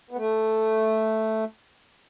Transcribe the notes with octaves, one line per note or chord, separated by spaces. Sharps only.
B3
A3